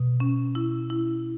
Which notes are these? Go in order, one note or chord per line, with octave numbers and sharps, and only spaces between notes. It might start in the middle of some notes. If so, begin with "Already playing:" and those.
Already playing: B2
C#4
E4
E4